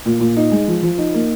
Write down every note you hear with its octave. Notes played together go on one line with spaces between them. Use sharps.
A#2
A#2
D#4
G#3
F3
F3
D#4
A#3